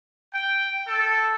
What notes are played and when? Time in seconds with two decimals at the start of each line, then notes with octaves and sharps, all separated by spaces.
0.34 G5
0.88 A4